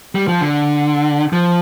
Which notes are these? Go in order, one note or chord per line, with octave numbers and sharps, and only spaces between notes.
G3
F3
D3
F3